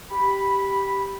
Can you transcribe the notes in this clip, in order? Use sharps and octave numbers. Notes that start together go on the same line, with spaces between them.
G4 B5